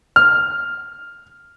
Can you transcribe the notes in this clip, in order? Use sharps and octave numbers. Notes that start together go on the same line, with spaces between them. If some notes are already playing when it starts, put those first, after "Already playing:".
F6